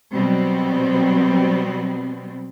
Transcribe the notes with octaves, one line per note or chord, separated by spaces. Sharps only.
B2 F#3 G3 B3 C4